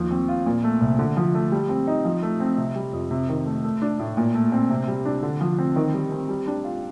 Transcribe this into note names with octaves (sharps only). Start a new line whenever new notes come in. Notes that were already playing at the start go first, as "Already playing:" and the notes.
Already playing: D#2 F3
C4
F4
A#2
A3
C2
D3
F3
A3
G3
C4
D#4
F3
A3
C4
C3
G3
F2
C3
D#3
A3
A3
D4
A2
A#2
A3
C4
C3
G3
D4
D3
F3
C4
D#3
G3
C4
G3
D4
F4